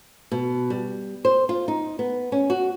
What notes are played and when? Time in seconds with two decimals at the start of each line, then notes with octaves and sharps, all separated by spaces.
0.32 B2
0.70 G3
1.25 C5
1.49 F4
1.68 D#4
1.99 B3
2.32 C#4
2.50 F#4